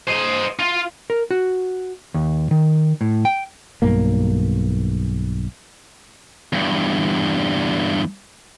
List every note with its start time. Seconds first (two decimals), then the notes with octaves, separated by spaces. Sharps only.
0.07 C5 D#5
0.59 F4
1.10 A#4
1.31 F#4
2.14 D#2
2.51 D#3
3.01 A2
3.25 G5
3.82 B1 G2 A#3
6.53 E2 G2